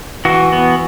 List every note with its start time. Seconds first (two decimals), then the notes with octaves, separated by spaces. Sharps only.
0.25 E3 F#4
0.52 B3